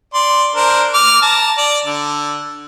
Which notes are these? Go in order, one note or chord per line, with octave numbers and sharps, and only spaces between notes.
D5 C6
D4 A#4 C5
D6 F6
A5 A#5
D5
D3